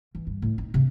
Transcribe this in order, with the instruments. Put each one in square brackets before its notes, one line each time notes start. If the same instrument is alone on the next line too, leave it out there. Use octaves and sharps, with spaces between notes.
[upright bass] E3
G2
A2
D#4
C3